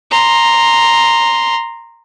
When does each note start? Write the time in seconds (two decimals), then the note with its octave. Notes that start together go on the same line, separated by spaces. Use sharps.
0.11 A#5 C6